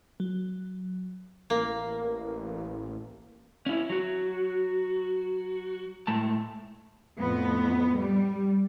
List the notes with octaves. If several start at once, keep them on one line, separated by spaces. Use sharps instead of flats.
F#3
A1 A#3
C#4 E4
F#3 F#4
A2 G#3 A5
F2 A2 B3
G3